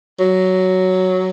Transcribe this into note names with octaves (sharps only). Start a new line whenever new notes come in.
F#3